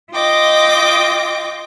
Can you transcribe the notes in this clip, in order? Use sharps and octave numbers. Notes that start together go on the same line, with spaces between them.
F4 D#5 G5 D6